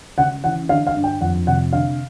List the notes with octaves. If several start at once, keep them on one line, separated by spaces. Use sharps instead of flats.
C#3 F#5
E3 F#5
D3 F5
F5
G2
G5
F2 F#5
C3 F#5
D3 F5